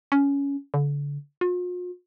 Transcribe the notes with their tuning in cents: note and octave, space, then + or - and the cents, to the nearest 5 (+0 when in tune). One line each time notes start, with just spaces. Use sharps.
C#4 +15
D3 -35
F4 +45